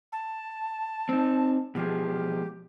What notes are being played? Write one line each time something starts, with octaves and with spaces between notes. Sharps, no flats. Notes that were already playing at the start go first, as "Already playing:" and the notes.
A5
C4 D#4
B2 F3 G#3 G4